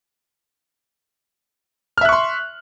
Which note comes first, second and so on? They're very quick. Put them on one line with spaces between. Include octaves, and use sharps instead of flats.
F6 E5 F#6 C#6 C6